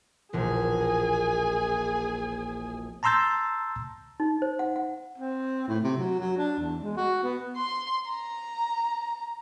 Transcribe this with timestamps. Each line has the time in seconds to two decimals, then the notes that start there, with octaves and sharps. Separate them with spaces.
0.33 E1 A#1 G#4 G#5
3.03 A5 A#5 C6 E6 G6 A6
4.20 D#4
4.42 C5
4.59 F#5
4.76 F#5
5.18 C4
5.68 A2
5.84 C3
5.98 F#3
6.19 F#3
6.38 D4
6.59 E2
6.83 G#3
6.97 F#4
7.23 B3
7.57 C6
8.10 A#5